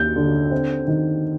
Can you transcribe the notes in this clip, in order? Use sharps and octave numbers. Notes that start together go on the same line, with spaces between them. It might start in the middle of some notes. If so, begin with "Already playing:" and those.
Already playing: D#2 G6
D3
C4
D#3